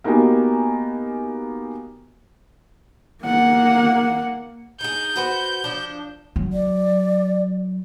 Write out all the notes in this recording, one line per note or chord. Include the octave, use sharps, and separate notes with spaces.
A#3 B3 D#4 F#4 G4 G#5
A#3 F#5
D#4 G#4 G6
F#4 B4 C5
F3 D4
F#3
D5